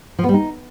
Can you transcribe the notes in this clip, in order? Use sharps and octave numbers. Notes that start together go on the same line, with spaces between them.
F3
B3
G3
D#4